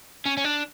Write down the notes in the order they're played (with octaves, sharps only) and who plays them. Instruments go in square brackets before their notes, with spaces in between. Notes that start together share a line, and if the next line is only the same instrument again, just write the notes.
[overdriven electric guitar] C#4
C#4
D4